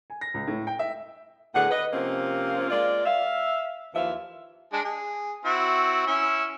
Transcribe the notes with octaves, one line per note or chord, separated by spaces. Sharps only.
G#5
A#6
C#2
A2
G5
E5
A2 D3 B3 G#4 F#5
B4 D#5
C3 F3 A#3 C4 C#4 F4
G#3 A#3 F4 D5
E5 F5
D#2 E3 F3 F4 E5 F5
G#3 D4 A5
G#4
C4 E4 F#4
C#4 E4 E5